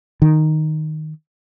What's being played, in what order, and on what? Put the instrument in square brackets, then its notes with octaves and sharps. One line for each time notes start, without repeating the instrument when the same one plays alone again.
[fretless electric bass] D#3